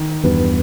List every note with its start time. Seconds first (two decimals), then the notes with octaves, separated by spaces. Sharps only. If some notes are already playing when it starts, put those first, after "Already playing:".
Already playing: D#3
0.24 E2 G2 B3